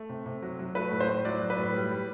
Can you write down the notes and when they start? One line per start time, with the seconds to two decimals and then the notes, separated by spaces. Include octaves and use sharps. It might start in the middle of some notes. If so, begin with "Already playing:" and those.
Already playing: A3
0.09 C3
0.26 C3
0.42 F#3
0.59 F#3
0.75 A3 B4
0.92 A2
1.01 C5
1.09 A2
1.25 F#3 D5
1.41 F#3
1.50 B4
1.58 A2
1.75 G3
1.92 G3